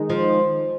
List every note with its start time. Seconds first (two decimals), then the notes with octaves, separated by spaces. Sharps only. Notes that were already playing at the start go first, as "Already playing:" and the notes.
Already playing: D#3 G#3 D#4
0.10 F3